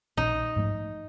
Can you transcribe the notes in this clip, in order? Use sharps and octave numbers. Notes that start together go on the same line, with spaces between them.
A#1 D#4
G#2 F3 A3